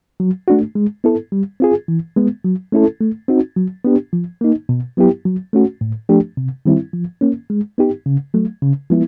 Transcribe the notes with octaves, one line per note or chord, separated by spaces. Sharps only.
F#3
A3 D4 F#4
G#3
B3 E4 A4
G3
C4 F4 G#4
E3
G#3 B3
F#3
A3 C#4 E4 A4
A3
C4 D#4 F#4
F#3
B3 D4 G4
F3
A#3 D#4
B2
F#3 B3 E4 G4
F#3
A3 C#4 F#4
A2
F3 A3 D4 G4
C3
D#3 G3 C4 E4
F3
A#3 C#4
G#3
B3 D#4 G4
C#3
F#3 A3
C#3
F3 G#3 B3 E4